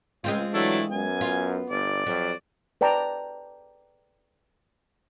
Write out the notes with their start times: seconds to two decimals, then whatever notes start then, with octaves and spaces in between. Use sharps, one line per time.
0.24 C#2 G#3 C4 F4
0.54 E3 F#3 A3 D4 E4
0.91 F#2 B3 G#5
1.21 F4
1.70 G1 D5
2.06 F2 F#3
2.81 B4 D5 G5 A5 A#5